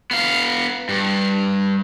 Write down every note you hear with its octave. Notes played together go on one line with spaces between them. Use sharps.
B3 F5
G2